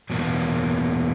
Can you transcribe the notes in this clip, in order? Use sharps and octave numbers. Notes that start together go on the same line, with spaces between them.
E2 B2 F#3 A#3